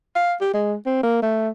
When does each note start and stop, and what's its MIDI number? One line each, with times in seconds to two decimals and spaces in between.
0.16 0.34 77
0.41 0.52 67
0.54 0.75 56
0.86 1.00 60
1.03 1.20 58
1.22 1.49 57